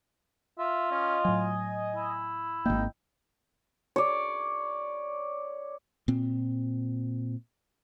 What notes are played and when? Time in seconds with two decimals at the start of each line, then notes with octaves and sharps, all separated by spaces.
0.58 F4 E5
0.91 C#4 D#5
1.25 A2 F#3 G#5
1.96 E4
2.66 G#1 E2 A#3 D#4 G5
3.96 C#5 D5
6.08 A#2 C4